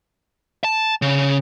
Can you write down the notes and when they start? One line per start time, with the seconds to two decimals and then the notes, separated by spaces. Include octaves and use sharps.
0.64 A5
1.02 C#3